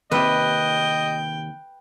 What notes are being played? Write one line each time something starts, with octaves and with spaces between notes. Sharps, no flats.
D#2 A2 C3 B4 D#5 G5